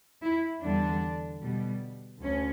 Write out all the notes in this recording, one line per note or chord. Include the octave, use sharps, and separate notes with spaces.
E4
E2 D3 G3 D4
B2 G3
D2 C#4